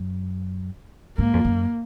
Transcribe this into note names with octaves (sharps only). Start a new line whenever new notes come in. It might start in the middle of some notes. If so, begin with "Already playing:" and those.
Already playing: F#2
G#2 A#3
F2
F#2